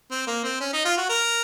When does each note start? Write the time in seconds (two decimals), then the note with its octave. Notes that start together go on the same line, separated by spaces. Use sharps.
0.11 C4
0.27 A#3
0.44 C4
0.60 C#4
0.73 D#4
0.85 F4
0.97 F#4
1.09 A#4